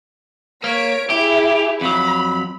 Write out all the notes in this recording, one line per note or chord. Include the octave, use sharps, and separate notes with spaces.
A#3 C#5 B6 D7
E4 G4 G#4
F2 F#3 B5